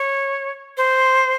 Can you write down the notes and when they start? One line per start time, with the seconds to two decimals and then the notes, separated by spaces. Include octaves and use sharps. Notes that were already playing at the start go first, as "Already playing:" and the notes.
Already playing: C#5
0.77 C5